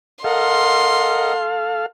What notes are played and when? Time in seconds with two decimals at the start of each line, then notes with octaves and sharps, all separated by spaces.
0.24 A4 A#4 D#5 F5 F#5 C6